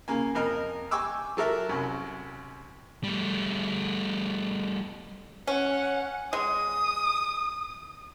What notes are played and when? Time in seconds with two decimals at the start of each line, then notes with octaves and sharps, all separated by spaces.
0.08 C#3 A#3 G#5
0.35 F2 A#4 D#5
0.91 G5 G#5 C#6 D6 E6
1.37 F#3 A4 A#4 E5
1.69 C2 F#2
3.04 G3 A3
5.47 C#4 F#5
6.33 G#3 D#6